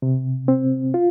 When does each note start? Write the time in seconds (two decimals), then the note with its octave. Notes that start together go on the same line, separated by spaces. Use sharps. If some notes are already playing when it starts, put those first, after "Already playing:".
0.02 C3
0.48 C4
0.94 F4